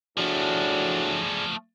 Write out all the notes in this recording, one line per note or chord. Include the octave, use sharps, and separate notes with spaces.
A2 F3 A3 D4 F#4 G#4 D5